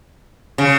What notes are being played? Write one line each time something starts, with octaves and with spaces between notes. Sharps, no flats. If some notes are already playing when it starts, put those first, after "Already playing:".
C#3